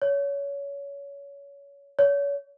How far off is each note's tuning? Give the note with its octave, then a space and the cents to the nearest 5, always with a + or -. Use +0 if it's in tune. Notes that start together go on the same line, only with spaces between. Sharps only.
C#5 +25
C#5 +35